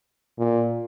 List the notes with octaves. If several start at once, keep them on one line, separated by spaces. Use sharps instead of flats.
A#2